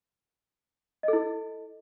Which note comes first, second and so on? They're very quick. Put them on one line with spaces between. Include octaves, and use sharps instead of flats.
D#5 A4 E4